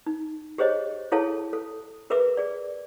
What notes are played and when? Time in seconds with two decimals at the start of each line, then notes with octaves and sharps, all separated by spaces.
0.06 D#4
0.58 G4 G#4 C5 C#5 D#5
1.12 E4 G#4 A4 C#5 F5 A5
1.53 A4
2.10 G#4 A#4 B4 E5 D6
2.37 G#4 D5